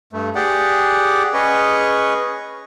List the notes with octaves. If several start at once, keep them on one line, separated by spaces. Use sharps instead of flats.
G2 A3
G4 G#4 D5 F#5
C#4 G#4 B4 C#5 D#5 C#6